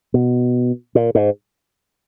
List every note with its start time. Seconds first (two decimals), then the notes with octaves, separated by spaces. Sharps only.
0.14 B2
0.95 A#2
1.15 G#2